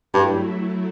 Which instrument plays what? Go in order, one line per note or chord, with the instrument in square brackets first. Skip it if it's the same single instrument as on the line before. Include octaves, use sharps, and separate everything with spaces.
[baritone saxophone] G2 [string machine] F#3 A3 E4